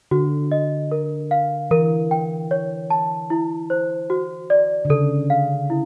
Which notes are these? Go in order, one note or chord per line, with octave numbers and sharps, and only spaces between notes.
D3 F#4
D#5
A#4
F5
E3 A#4
G5
C#5
A5
E4
C5
F#4
D5
D3
C#3 A4
F5
E4